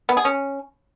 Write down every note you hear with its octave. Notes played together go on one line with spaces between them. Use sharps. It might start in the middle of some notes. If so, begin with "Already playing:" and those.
B3
G#4
C#4